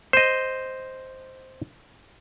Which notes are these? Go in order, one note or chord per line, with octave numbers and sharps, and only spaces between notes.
C5 D#5